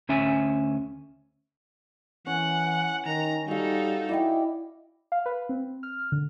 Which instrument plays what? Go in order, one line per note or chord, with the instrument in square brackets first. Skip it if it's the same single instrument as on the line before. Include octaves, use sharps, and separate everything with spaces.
[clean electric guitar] D2 C#4 E5 G#5
[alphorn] E3 [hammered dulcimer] C#4 [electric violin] F#5
[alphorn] D#3 [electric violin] A#5
[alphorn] G3 [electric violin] D#4 A4 [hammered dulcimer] F#4 F5
[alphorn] E4 [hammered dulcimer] D5 D#5 G5
[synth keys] F5
B4
C4
F6
D3